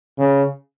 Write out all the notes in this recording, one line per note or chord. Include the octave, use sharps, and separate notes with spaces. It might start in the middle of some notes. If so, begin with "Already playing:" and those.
C#3